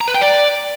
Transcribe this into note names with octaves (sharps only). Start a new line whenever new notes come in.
A#5
B4
G5
D5